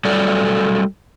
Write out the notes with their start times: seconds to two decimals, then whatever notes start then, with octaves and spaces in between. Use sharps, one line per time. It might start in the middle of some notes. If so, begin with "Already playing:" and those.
0.05 F#3 G3 A3 A4 D5